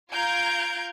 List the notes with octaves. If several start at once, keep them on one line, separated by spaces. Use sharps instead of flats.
F4 F5 A#5 G6 G#6 D7